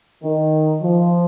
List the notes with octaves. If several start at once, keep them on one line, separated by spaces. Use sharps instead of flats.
D#3
F3